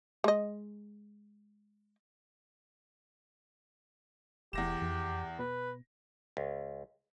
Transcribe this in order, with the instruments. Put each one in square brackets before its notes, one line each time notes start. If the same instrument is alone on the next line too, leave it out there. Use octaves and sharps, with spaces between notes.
[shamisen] G#3 D#5
[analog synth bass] E1 [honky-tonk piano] E2 A#6 E7 [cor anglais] G4
[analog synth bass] F2
[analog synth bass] B2 [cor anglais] B4
[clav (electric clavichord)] C#2